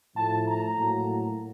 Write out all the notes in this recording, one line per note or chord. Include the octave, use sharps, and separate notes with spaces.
A2 F3 A3 A5
A#5
A2 F#3 A#3